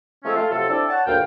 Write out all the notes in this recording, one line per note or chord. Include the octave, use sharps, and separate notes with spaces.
F3 G#3 A3 C4 C#4
A3 F4
C3 F3 F#3 A4
C4 D4 E4 A4 D5 A5
C#5 F#5 A5
D2 G2 A#2 F5 G5